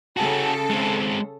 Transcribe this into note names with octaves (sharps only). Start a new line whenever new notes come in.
C#3 F#4 G#4 A4
G#3 C4